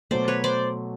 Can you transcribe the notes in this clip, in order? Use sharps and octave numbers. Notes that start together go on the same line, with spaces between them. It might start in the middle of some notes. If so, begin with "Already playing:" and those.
B2 F#3 A3 C5 D5
B4 C#5
C5 D5